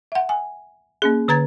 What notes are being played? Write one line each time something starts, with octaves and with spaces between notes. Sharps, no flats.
E5 F#5
G#5
A#3 C#4 G#4
D3 B4 A#5 G#6 A6